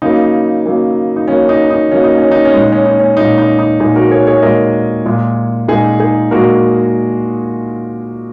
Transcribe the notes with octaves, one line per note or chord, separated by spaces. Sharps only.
C#3 F#3 A#3 D#4
C#3 F#3 A#3
D#4
C#3 F#3 A#3 C#4
D#4
D#4
C#3 F#3 A#3 C#4
D#4
C#4
D#4
C#4
A#2 G#3 D#4
C#4
D#4
C#4
A#2 G#3 D#4
D#4
D#4
A#2 G#3 D#4 G#4
F#4 A#4
G#4 C#5
G#4 C#5
A#2 G#3 A#4 D#5
A#2 G#3
A#2 G#3 D#4 G#4
D#4 G#4
A#2 G#3 F#4 A#4